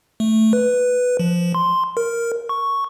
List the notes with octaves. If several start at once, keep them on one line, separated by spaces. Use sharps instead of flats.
A3
B4
F3
C6
A#4
C#6